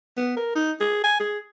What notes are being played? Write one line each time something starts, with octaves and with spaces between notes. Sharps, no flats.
B3
A#4
D#4
G#4
G#5
G#4